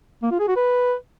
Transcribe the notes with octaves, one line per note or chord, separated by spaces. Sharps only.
A#3
F4
G#4
F#4
B4